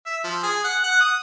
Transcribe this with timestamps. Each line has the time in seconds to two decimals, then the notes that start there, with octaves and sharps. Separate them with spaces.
0.06 E5
0.24 F3
0.43 G#4
0.64 F#5
0.83 F#5
1.00 D#6